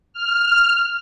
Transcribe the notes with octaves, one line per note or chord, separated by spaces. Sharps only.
F6